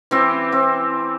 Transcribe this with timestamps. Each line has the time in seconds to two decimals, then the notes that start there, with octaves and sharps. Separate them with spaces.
0.11 E3 C4 G4
0.52 C4